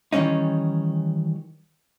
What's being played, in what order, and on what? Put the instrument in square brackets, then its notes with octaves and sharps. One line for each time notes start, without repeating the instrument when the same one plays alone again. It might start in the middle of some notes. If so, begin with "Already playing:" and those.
[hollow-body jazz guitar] D#3 E3 G3 C#4 D#4